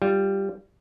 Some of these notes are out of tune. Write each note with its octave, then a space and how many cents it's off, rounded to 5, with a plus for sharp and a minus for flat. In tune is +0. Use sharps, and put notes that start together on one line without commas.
G3 +0 F4 +0